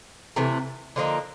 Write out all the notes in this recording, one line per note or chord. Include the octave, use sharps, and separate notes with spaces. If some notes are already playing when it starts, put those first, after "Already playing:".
C3 E3 A3
D3 F3 A#3 D#4